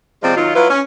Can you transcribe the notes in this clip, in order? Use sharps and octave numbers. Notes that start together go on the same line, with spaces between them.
C3 F3 G#3 C4 D5
D#3 F#3 D#4 F4
F#3 E4 F4 B4
C#4